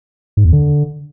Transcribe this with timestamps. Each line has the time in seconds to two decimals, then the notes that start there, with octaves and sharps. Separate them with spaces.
0.37 G#2
0.45 E2
0.53 D3